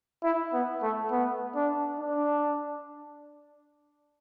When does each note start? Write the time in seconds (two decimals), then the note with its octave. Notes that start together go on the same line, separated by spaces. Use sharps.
0.23 E4
0.53 B3
0.82 A3
1.11 B3
1.55 D4
1.99 D4